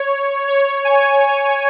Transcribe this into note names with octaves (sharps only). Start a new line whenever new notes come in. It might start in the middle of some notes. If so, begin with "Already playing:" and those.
Already playing: C#5
C#5
G#5